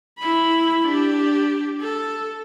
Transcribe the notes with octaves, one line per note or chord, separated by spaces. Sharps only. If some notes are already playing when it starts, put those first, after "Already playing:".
E4 B5
D4 G4
A4